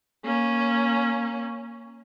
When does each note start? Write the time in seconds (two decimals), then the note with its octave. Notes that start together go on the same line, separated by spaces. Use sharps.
0.25 A#3 C#4